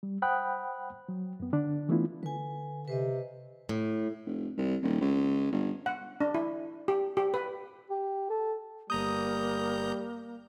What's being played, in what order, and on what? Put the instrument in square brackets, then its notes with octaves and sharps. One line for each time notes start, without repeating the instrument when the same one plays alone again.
[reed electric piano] G3
C5 F#5 G5 B5 D#6 F#6
F#3
F#2 B3
D3 D4
E3 A3 B3 D4 E4 F4
[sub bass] D3 [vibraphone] B4 G#5
[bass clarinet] C3 [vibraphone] B4 C5 D#5
[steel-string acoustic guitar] A2
[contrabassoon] F1
C2
D#1
C#2
G1
[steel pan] F#5
D4
E4
G4
G4
B4
[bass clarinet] G4
A4
[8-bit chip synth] G1 A#5 G6 [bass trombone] G3 [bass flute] A#3 [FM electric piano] D#6